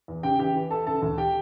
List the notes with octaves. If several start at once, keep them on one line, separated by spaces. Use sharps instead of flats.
E2
C#3 G4 G5
E3 G4 G5
E3
E3 A4 A5
C#3 A4 A5
D2
G4 G5